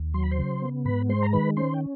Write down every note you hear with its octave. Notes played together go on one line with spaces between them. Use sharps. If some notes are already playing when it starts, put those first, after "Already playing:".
Already playing: D#2
F#3 C6
B5
C5 C6
C#3
B3
G#2 B4 B5
G#3 C5 C6
A#5
D#3 B4 B5
C#4 C5 C6
G5